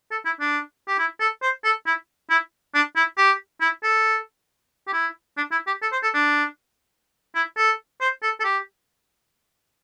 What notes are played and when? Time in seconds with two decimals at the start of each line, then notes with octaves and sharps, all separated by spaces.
0.11 A4
0.25 E4
0.41 D4
0.88 G4
0.99 E4
1.20 A4
1.42 C5
1.64 A4
1.86 E4
2.30 E4
2.75 D4
2.96 E4
3.18 G4
3.61 E4
3.83 A4
4.88 G4
4.93 E4
5.37 D4
5.52 E4
5.67 G4
5.82 A4
5.92 C5
6.03 A4
6.14 D4
7.35 E4
7.57 A4
8.01 C5
8.23 A4
8.40 A4
8.44 G4